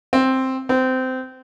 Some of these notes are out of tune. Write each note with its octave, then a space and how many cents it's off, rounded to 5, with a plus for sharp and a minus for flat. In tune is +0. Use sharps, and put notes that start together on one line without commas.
C4 +5
C4 -20